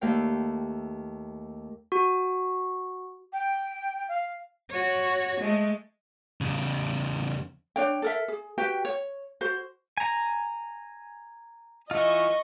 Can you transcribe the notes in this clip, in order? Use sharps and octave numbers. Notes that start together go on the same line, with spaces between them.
D#2 A3 F5 G5
F#4
G5
F5
F#4 C#5
G#3 A3
E2 C#3
D4 C#5 G5
A4 A#4 E5
G#4
F#4 G4 B4 G5
C#5
F#4 C5
G#5 A#5
E3 F4 D#5 C#6